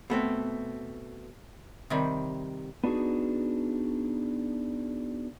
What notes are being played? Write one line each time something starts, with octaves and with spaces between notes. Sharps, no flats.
B2 A3 C4
C3 D#3 G3
B3 D4 D#4 F#4 G#4